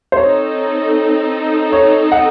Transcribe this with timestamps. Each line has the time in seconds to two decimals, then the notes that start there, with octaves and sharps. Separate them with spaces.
0.12 C5
0.17 C4 D#4 A4 C#5
1.73 C#5
2.12 F#5